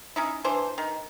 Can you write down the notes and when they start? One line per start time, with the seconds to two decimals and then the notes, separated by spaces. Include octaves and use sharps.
0.16 C#4 D#4 E4
0.45 E3 D4 C5
0.78 D#3